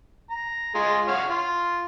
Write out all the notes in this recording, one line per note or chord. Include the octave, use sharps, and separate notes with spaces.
A#5
G#3 F4
C#5 F5 F#5
F4